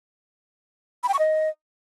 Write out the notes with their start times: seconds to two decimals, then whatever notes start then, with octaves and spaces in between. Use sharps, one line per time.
1.03 B5
1.09 G5
1.14 C#6
1.19 D#5